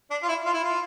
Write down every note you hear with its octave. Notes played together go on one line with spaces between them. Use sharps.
D4
F4
E4
F4
E4
F4